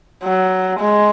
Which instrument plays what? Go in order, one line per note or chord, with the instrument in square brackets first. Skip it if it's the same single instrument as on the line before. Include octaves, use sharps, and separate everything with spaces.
[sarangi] F#3
G#3